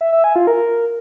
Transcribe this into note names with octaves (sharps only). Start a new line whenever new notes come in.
E5
E5
G#5
F4
A#4